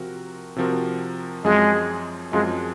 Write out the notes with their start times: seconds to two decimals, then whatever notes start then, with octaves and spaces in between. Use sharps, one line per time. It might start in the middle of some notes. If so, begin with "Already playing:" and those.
Already playing: C3 F3 C4 F#4 A#4
0.56 C3 F3 C4 F#4 A#4
1.44 F#2 F3 G#3 C4 F4 G#4
2.33 F#2 F3 G#3 C4 F4 G#4